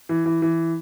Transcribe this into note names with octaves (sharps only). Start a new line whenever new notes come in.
E3
E3
E3